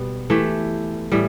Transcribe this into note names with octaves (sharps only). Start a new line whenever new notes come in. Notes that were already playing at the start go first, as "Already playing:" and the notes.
Already playing: B2 G3 B3
E3 A3 G4
A2 E3 G3